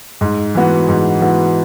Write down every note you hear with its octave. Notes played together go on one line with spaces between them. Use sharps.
G#2
E3 B3 F#4
G#2
E3 B3 F#4